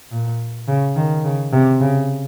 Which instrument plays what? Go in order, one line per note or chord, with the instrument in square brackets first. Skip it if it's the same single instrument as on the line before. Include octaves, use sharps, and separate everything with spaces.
[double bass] A#2
C#3
D#3
C#3
C3
C#3